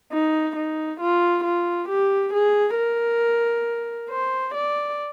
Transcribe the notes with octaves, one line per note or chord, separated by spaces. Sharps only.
D#4
D#4
F4
F4
G4
G#4
A#4
C5
D5